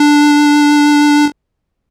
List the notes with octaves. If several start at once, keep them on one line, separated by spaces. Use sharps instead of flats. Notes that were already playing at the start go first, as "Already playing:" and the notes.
Already playing: D4